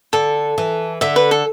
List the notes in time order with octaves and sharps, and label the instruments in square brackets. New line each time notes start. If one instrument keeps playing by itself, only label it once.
[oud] D3 [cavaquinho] A4
[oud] E3
[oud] D3 [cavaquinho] E5
[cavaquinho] B4
A4